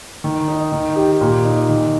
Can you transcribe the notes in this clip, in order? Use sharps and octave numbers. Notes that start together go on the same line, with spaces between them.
D#3
D#4
D#3
G4
A#2
D#4
D#3